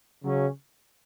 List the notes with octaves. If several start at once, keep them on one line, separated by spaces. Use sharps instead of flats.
C#3 F#3 C#4